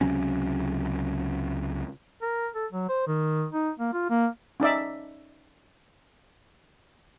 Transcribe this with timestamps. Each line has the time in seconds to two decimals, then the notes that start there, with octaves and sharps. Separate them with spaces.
0.01 C#2 C3 F#3 C#4
2.22 A#4
2.55 A4
2.72 F#3
2.89 C5
3.07 D#3
3.53 D#4
3.79 A#3
3.93 F4
4.10 A#3
4.60 C#4 D#4 D5 E5